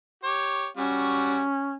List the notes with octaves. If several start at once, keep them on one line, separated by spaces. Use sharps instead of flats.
G4 C#5
G3 C#4 F#4